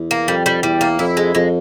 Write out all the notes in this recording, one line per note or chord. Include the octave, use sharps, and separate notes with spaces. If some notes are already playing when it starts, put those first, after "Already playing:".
Already playing: E2
A#3
F2 G3
G3
E2 G3
A#3
F2 E4
G#3
F2 G#3